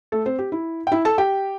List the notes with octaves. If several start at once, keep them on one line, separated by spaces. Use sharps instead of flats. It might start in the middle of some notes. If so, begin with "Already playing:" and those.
A3 A4
C4 C5
G4
E4
G5
E4 E5
A4 A5
G4 G5